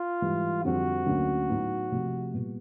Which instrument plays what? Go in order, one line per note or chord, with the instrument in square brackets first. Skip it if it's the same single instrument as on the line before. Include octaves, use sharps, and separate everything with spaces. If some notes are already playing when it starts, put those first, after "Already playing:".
Already playing: [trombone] F4
[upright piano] G#2 E3 G3
[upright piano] F2 D3 G3 C4 [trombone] F#4
[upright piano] D2 D3 F#3 A#3 C#4
A2 F#3 B3 D#4
C3 F3 A3
A#2 G3 B3